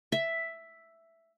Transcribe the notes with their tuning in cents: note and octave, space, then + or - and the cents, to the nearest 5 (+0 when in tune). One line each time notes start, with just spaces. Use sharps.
E5 +5